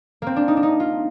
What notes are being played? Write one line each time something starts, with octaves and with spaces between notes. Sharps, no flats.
A#3 C4
D4
D#4
D4
D#4
F4